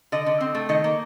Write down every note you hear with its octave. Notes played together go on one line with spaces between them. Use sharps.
D3 D#5
D3
C4
A3
D#3 D#5
A#3